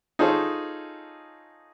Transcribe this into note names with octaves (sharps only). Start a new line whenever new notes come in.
D#4 F4 G#4 A4 C5 C#5